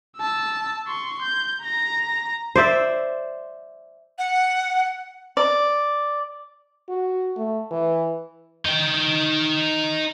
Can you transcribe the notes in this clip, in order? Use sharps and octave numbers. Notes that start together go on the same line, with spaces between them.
A5 E6
C6 C#6
G6
A#5 A#6
C5 D5 E5
F#5
D5
F#4
A3
E3
D#4 G5